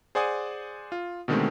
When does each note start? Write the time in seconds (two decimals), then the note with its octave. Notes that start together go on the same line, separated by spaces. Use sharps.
0.15 G#4 C5 D5 F#5 G#5 D#6
0.92 F4
1.28 B2 D3 D#3 G#3 A3 C4